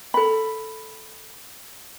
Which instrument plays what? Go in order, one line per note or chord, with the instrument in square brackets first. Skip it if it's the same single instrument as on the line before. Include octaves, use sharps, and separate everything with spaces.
[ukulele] A4 B5